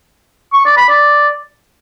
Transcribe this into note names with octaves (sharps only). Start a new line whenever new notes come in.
C#6
D5
B5
D5